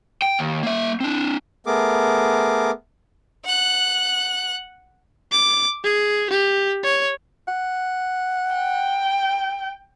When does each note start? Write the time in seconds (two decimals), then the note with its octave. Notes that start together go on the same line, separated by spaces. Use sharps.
0.22 G5
0.39 D#2
0.63 A#3 E5
1.00 C4 D4
1.66 A3 B3 G#4 A#4 D6
3.44 F#5 F#6
5.32 D6
5.84 G#4
6.30 G4
6.84 C#5
7.48 F#5
8.56 G5